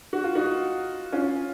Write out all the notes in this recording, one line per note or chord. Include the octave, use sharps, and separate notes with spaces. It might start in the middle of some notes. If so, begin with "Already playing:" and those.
F#4
F4
D#4 F#4
C#4 F4